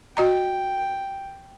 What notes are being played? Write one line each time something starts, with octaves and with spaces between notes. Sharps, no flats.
F#4 D#5 G5 A#5